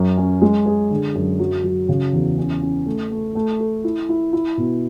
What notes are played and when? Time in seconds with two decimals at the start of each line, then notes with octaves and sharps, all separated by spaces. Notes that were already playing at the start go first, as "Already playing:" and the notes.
Already playing: F#2
0.17 C#4
0.42 G#3
0.66 G#4
0.91 D3
1.15 F#2
1.39 F#3
1.64 F#3
1.89 C#3
2.13 E2
2.38 C#4
2.62 C#4
2.86 A3
3.11 A3
3.35 A3
3.60 A4
3.84 E4
4.09 E4
4.33 E4
4.57 B2